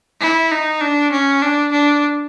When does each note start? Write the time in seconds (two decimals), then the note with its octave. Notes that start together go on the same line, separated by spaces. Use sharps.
0.21 E4
0.51 D#4
0.81 D4
1.12 C#4
1.42 D4
1.72 D4